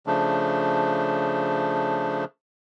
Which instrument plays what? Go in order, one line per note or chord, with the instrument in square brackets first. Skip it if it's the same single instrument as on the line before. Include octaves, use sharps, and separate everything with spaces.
[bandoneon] C#3 F3 A3 D4